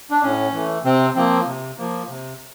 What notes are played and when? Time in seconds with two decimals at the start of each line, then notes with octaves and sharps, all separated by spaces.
0.10 D4
0.23 A2 C#4
0.53 E3 A3
0.84 C3 C4
1.15 F3 A#3 C4
1.46 C3
1.78 F3 A#3
2.09 C3